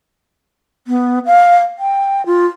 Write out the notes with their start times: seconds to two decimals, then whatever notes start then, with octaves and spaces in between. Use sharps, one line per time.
0.87 B3
1.26 F5
1.79 G5
2.26 F4